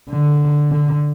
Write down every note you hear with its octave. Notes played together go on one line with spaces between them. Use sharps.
D3
D3